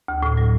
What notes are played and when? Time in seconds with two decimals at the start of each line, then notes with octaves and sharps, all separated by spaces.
0.08 D2
0.23 A2
0.37 F#3